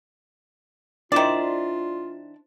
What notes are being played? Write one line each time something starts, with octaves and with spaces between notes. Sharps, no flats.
D#3 D4 E4 F4 C5 D5